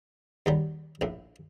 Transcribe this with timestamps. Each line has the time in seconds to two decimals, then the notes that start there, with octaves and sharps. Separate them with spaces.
0.46 D#2 F#3 G3
1.01 A#1 A2